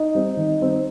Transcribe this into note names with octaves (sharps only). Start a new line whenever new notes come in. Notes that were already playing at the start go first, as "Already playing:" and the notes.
Already playing: D#4 D#5
G3 C4
D#3
G3 C4